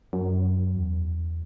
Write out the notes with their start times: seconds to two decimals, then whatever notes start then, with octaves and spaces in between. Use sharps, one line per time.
0.13 F#2
0.76 E2